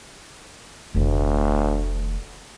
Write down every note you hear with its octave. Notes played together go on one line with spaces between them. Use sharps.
F1 D2 D3